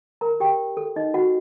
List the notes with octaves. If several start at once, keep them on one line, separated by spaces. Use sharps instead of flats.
A#4 A#5
G4 G5
A4
D#4 D#5
F#4 F#5